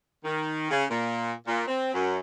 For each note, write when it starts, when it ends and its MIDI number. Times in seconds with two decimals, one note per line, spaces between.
0.25 0.70 51
0.71 0.85 49
0.91 1.32 46
1.47 1.63 46
1.67 1.92 60
1.94 2.18 42